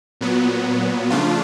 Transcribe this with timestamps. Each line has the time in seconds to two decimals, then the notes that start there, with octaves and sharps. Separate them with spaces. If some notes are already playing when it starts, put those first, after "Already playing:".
0.21 A#2 F#3 B3
1.10 C#3 F3 A3 D4 F4